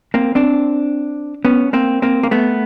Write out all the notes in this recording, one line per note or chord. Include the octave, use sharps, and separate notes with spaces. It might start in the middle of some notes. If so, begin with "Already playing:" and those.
A#3 C4
C4 D4
B3 C#4
A#3 C4
A#3 C4
A#3
A3 B3